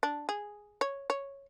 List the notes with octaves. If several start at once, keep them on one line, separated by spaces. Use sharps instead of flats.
D4
G#4
C#5
C#5